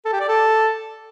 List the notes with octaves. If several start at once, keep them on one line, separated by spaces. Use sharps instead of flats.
A4
G4
D5
A4